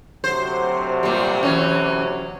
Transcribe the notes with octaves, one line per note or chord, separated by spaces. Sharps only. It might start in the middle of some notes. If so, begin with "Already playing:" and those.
D2 C3 F#3 C5
A#2 G3
E3 C#4